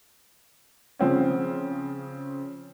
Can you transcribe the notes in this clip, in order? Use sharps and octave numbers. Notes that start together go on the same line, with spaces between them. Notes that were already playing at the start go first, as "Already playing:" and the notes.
C#3 F3 C4 C#4